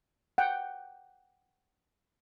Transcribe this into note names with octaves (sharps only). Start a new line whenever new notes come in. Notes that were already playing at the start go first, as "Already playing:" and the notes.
F#5 G5